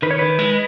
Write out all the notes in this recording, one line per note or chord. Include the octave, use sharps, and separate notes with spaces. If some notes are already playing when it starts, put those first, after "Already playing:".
D#3 B4
C#5
D#3 B4
G#3